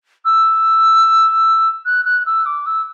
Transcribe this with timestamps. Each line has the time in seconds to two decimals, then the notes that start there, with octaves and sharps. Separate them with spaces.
0.25 E6
1.85 F#6
2.05 F#6
2.26 E6
2.45 D6
2.66 E6